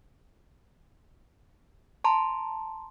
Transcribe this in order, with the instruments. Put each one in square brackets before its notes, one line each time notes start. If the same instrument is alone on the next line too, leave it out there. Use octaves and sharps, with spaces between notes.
[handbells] A5 A#5 C6